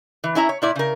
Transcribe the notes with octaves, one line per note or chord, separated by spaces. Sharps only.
E3
C#4 E4 E5 A#5
C#5
A#2 E4 D5
C#3 A#4